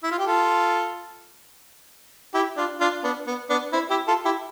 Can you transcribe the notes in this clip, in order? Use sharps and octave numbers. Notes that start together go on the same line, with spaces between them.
E4
F4
G4
F4 A4
E4 G4
D4 F4
D4 F4
B3 D4
B3
B3 D4
C4 E4
E4 G4
F4 A4
E4 G4